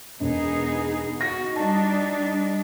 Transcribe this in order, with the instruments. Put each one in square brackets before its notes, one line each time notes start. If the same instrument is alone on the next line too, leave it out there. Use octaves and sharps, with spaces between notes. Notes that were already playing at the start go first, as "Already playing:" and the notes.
[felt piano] E1 [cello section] B3 D#4 G#4
[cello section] F#4 [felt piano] A#6
[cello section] G3 D4 D#4 [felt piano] A5